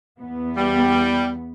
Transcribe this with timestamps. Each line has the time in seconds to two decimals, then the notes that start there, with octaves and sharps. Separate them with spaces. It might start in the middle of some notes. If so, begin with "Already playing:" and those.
0.21 E2 B3
0.57 G3